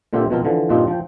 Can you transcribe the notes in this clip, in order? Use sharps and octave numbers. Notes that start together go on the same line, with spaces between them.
A#2 D3 C4 F4 G4 E5
B2 F3 C4 F4 A#4
D3 E3 F3
G2 A#2 F3 C4 D#4 F4
F3 G5